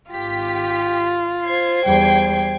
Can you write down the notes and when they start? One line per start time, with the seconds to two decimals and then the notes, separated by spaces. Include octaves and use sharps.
0.11 G#1 F4 G4 B6
1.44 C5 G#6 C7
1.85 E2 G3 G5